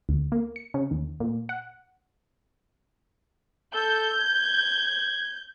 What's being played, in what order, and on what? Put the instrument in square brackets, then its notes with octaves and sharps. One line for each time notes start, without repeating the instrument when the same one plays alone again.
[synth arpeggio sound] D2
A#3
C#7
C#3
D#2
A#2
F#5
[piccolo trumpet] A4 [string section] G6
[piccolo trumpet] G#6